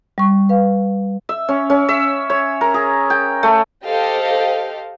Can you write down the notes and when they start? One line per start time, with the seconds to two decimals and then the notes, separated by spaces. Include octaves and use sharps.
0.18 G3 C#6
0.49 B4 F5
1.29 E5
1.48 C#4
1.70 C#4
1.89 E5
2.30 C#5
2.61 A#4
2.74 G#4
3.10 G5
3.43 A3
3.85 G4 A4 C5 D#5 F5